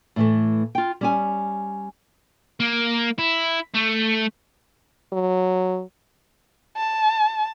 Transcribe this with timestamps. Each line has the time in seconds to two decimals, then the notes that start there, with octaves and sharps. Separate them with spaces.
0.16 A2 E3 A3
0.75 F4 G5
1.01 G3 C#4 G#5
2.60 A#3
3.18 E4
3.74 A3
5.12 F#3
6.77 A5